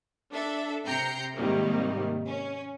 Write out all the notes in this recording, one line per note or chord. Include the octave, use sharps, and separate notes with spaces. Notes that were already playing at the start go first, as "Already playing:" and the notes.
D4 A4 E5
C3 G5 A#5 G6 C7 C#7
G#2 C3 D#3 G3 A#3
C#4